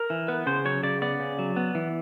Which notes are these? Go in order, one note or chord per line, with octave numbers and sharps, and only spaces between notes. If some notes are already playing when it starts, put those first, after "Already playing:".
Already playing: A#4
E3
B3 B4
C#3 C5
F#3 C#5
C#3 D5
B3 D5
C#3
F#3
B3
E3